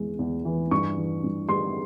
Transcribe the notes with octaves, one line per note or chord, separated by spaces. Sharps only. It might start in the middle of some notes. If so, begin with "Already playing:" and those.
Already playing: E2 E3 G#3
E2
E3
G2 C#6
E3
G2
G3 C6